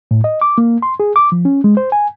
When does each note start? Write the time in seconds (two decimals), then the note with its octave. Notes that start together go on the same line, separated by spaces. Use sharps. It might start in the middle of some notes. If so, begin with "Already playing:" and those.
0.11 A2
0.24 D#5
0.41 D6
0.58 A#3
0.82 C6
1.00 G#4
1.16 D6
1.32 F3
1.45 C#4
1.64 G#3
1.77 C5
1.92 G#5